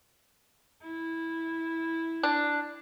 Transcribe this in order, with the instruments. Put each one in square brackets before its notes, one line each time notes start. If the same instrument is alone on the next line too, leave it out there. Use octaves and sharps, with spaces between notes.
[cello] E4
[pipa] D4